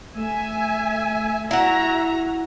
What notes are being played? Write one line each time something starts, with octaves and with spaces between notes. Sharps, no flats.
A3 E5 G#5
E4 F#4 E5 F#5 A#5